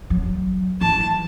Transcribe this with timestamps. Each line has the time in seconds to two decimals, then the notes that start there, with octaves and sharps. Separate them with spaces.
0.10 F#3
0.81 E3 A5